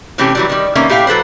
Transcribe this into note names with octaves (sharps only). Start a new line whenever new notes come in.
C3 E3 A3 C#4 G4
E3 F#3 G3
D#3 G3
D#3 A#3 B3 C#4 E5
A2 G4 E5 F5 G5
F#3 A4 B4 C5